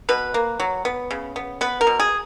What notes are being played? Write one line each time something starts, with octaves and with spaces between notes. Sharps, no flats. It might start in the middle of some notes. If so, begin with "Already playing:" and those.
B2 B4
A#3
F#3
B3
C#3
B3
B3 B4
A#4
B2
G#4